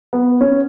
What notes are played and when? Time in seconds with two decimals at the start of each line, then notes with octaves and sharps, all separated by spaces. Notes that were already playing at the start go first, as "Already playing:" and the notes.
0.13 B3
0.41 C#4